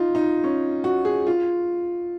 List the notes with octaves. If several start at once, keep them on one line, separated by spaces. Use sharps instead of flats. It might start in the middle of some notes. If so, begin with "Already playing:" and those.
Already playing: D#4 F4
D#4
C#4
F#4
G#4
F4